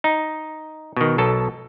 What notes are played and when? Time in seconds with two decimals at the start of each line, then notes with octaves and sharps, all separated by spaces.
0.04 D#4
0.96 B2 D#3
1.18 B1 B2 A4 A5